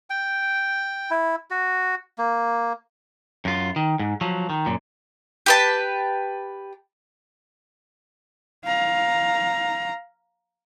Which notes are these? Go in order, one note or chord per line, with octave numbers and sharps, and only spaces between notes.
G5
E4
F#4
A#3
F#2 F4
D#3
G#2
F3 F#3
D#3
F#2 A#2
G4 B4 A5
F5 A#5